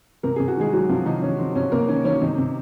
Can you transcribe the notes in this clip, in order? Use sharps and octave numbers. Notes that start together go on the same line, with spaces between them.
C3 A#4
C3 G#4
F#4
D#3 G#3 G#4
D#3 F#3 F#4
C3 F3 F4
C3 D#3 D#4
D#3 C#4
D#3 C4
C3 C#4
C3 A#3 A#4
D#3 C#4 C#5
D#3 C#4 C#5
C3 D#3 D#4
C3